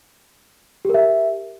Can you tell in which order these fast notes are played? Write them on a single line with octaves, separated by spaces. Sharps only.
G4 A#4 E5